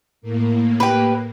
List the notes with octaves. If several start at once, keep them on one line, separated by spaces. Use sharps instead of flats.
A2 A#3
G4 B4